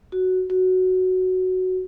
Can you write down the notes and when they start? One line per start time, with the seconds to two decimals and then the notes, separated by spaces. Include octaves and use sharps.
0.12 F#4
0.50 F#4